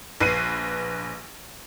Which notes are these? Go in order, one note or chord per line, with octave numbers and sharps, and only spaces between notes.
A#1 B4 C7 D#7